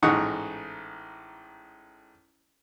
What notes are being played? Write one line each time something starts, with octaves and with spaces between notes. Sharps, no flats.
A1 G#2 D#4 F#5 C#6 D#6